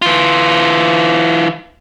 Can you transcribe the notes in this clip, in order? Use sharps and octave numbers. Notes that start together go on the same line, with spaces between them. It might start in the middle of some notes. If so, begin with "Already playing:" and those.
E3 F4